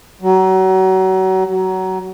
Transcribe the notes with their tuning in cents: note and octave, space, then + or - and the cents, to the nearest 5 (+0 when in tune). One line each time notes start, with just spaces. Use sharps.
F#3 +30
F#3 +20